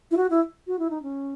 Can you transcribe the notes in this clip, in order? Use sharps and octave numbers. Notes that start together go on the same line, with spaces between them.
E4
F#4
E4
F#4
E4
D#4
C#4